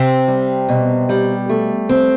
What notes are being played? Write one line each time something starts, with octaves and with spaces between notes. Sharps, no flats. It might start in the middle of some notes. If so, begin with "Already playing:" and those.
Already playing: C3 C4
G3
B2
G3
A3
C4